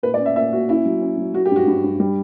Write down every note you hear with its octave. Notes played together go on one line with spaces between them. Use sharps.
A#2 B4
D5
C#4
E5
A#2 E5
A#3 F#4
C#4 E4
F#3
C#4
F#3
F#3 F#4
G4
G2 F#4
G2
G2
G3